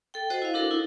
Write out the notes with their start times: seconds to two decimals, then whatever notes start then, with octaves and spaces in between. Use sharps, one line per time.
0.14 A4 G5
0.30 F#4 C5 D#5 F#5
0.42 E4 F5
0.54 D4 E4 F#4 A4 A#4
0.71 D#4 E4